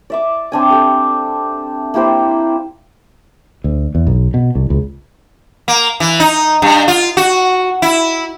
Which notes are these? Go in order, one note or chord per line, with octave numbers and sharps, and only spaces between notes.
D5 E5 D6
C4 D4 G#5
G4 A4
A#3 E4 G4 C5
D2
E2
B1
B2
C2
C#2
A#3
E3
D#4
G2
F4
F#4
E4